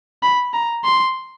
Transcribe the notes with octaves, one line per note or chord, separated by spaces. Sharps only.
B5
A#5
C6